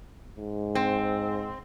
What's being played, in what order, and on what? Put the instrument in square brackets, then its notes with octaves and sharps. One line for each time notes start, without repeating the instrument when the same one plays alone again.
[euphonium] G#2
[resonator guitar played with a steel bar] C4